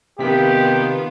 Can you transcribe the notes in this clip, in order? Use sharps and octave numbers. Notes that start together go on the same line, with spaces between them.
C3 D#3 B3 F4 G4 B6